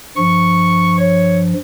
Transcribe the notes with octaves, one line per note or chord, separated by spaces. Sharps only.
G2 F3 C#6
C#5